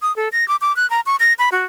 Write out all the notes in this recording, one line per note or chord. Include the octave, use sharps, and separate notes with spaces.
D#6
A4
A#6
D6
D6
F#6
A#5
C#6
A#6
B5
F#4